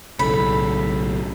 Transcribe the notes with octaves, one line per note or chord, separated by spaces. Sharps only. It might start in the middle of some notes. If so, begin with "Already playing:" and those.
B1 A2 C#3 A3 B5